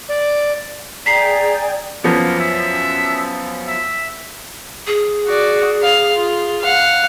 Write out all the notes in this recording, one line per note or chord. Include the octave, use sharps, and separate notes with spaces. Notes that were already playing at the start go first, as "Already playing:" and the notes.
D5
G#4 D5 G5 G#5 A#5 B6 C7
F#2 F3 A#3 B3
E5
E5
G#4
F#4 D5
F5
F4
F5 F#5